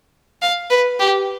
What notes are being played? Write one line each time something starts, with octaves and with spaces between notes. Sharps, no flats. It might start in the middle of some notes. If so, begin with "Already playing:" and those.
F5
B4
G4